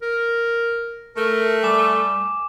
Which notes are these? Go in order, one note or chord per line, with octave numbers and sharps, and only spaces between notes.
A#4
A3 A#4
G3 G#5 D6 E7